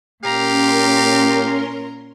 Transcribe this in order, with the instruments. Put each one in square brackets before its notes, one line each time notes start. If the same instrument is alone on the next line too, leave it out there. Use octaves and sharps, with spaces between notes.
[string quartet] A#2 A#5 [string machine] C#4 A#4 C6 [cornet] G4 [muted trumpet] F5